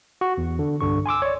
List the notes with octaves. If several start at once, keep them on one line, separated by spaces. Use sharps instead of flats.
F#4
E2
D3
C2 G2 D3 C#6
G#5 C6 D6 E6
C#5 D5